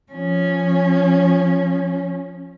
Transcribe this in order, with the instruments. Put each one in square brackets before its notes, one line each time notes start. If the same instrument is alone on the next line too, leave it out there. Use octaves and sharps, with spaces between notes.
[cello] F3 C#4